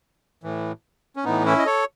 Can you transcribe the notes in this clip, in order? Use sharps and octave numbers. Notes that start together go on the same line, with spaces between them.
A2 E3
C#4
A2 E3 B3 D#4
C#4 E4
D#5
A4 C#5